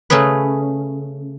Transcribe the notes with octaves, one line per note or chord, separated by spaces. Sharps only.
C#3 A3 C#4 G#4 B4